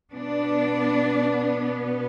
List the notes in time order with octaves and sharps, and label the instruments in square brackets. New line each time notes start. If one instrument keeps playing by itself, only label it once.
[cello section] B2 B3 D4